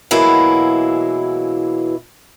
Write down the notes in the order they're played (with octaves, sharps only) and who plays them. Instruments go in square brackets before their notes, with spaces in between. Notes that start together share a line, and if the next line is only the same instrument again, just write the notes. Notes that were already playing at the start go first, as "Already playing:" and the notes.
[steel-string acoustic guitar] B2 E3 F#3 G#3 A#3 E4